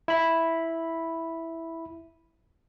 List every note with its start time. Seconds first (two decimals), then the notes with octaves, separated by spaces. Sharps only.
0.08 E4 B5